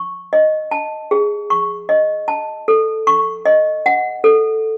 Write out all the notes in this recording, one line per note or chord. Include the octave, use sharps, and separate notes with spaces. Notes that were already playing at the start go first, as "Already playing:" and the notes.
Already playing: C#6
D#5
A5
G#4
C#6
D#5
A5
A4
C#6
D#5
F#5
A4